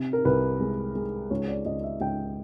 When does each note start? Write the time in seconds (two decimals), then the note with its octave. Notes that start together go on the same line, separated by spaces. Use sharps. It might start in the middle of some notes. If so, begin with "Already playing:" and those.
Already playing: C3
0.13 A#4
0.25 C2 B4
0.60 G#3
0.95 G#3
1.30 C#2 C#5
1.48 D5
1.66 C#2 D#5
1.83 E5
2.01 C#2 G5